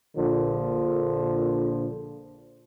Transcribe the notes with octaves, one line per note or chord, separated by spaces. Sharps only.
A#1 A#2 D3 F3